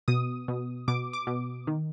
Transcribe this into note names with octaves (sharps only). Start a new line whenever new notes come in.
B2 D#6
B2
B2 D6
D6
B2
D#3